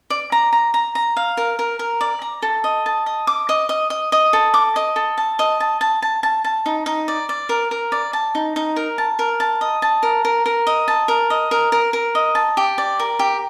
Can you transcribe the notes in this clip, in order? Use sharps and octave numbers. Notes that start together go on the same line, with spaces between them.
D5
A#5
A#5
A#5
A#5
F5
A#4
A#4
A#4
D5
A#5
A4
D#5
A5
D#5
D6
D#5
D#5
D#5
D#5
A4
D6
D#5
A4
A5
D#5
A5
A5
A5
A5
A5
D#4
D#4
D5
D5
A#4
A#4
D5
A5
D#4
D#4
A#4
A5
A#4
A5
D#5
A5
A#4
A#4
A#4
D#5
A5
A#4
D#5
A#4
A#4
A#4
D#5
A5
G4
D5
A#4
G4